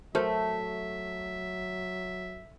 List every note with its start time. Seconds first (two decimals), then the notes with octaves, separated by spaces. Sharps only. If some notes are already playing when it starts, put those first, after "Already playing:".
0.15 F#3 A3 F#4 A#4 C5 E5